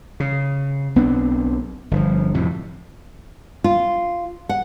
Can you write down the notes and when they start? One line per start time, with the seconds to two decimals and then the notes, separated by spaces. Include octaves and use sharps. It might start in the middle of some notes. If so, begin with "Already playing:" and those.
0.20 C#3
0.96 B1 B3 C4 D4
1.91 G1 C#3 F3
2.34 F2 A2 C3
3.64 F4
4.49 F#5